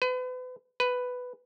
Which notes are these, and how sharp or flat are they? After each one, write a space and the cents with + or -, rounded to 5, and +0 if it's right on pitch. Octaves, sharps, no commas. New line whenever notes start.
B4 +35
B4 +5